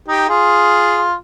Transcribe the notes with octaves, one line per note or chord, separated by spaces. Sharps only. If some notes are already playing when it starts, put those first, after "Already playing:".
D#4 G4
F4 G#4